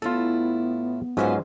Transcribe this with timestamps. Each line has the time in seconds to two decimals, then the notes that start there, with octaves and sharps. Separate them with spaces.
0.02 A2 B3 E4 F4 A4
1.17 G#2 F#3 C#4 F4 B4 C5